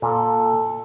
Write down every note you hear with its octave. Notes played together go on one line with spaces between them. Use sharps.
A#2 A4